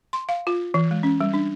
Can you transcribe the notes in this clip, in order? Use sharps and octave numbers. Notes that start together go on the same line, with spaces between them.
C6
F5
F4
E3
G#3
C#4
G3
D4